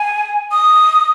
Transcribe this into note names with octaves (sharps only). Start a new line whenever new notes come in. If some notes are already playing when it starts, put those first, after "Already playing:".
Already playing: G#5
D#6